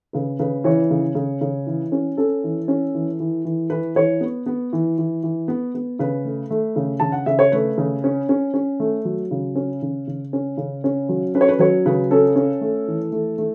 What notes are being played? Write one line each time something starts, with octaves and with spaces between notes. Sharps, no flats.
C#3 B4
C#3 B4
E3 C#5
C#3
C#3
C#3
E3
C#4
C#4 A4
E3
C#4
E3
E3
E3
E3 B4
E3 C#5
B3
B3
E3
E3
E3
B3
B3
C#3 B4
A3
A3
C#3
C#3 A5
F#5
C#3 E5
C#5
A3 B4
C#3
C#4
C#4
C#4
A3
F#3
C#3
C#4
C#3
C#3
C#4
C#3
C#4
F#3
C#4 B4
C#5
B4
F#3 C#5
C#3 B4
C#4 A4
C#4
A3
E3
A3
A3